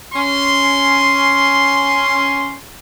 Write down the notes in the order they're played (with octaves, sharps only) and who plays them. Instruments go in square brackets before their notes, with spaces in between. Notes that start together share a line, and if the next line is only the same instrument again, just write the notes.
[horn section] C#4 C6